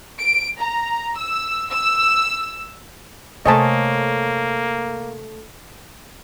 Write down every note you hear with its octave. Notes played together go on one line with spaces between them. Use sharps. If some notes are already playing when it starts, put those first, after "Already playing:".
D7
A#5
E6
E6
C3 A3 A#3 C5 C#5 D#5 G#5 A5